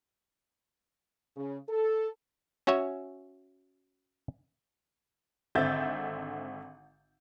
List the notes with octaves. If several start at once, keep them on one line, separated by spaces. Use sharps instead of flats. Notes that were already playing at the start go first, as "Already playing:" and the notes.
C#3
A4
C#4 F#4 C#5 E5 G#5
G#1 D3 C4 E5 G6 A6